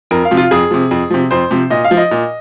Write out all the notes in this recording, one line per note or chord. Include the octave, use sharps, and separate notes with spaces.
F2 A#4
F5
C3 F3
F4
F2 G#4
C3 F3
F2
C3 F3
F2 C5
C3 F3
A#2 D#5
F5
F3
D#5
A#2